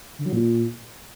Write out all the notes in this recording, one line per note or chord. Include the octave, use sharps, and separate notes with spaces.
D3
F#3
A#2